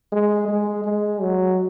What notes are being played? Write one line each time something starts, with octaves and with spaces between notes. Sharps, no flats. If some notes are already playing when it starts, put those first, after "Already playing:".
G#3
G#3
G#3
F#3